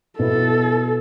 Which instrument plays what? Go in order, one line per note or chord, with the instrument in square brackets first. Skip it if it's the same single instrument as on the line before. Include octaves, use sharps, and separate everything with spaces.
[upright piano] B2 B3 E4 [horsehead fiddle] A4